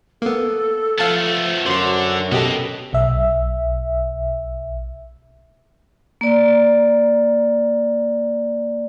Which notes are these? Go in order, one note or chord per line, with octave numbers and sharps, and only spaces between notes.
A#3 B3 A4
F3 A3 B3 F5 A5 A6
F#2 D3 F#4 C5 C6
B2 G4 A4 B4 D#5
B1 E5
A#3 D5